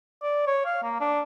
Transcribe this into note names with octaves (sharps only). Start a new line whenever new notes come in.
D5
C#5
F5
A#3
D4